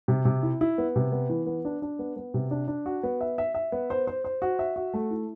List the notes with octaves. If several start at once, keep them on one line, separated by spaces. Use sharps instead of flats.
C3
C3
E4
E4
B3
C3
B3
E3
B3
D4
D4
B3
B3
C3
D4
D4
F#4
B3
E5
E5
E5
B3
C5
C5
C5
F#4
E5
F#4
A3
E4